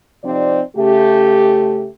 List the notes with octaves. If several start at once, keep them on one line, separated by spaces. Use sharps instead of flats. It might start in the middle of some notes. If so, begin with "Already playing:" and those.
C3 F3 C4 D#4 D5
C#3 A3 G4